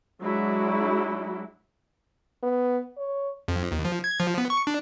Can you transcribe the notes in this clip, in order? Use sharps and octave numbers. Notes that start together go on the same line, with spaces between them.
F#3 G#3 D4 E4 F#4
B3
C#5
F2
D#2
F3
G#6
F3
B3
C#6
D4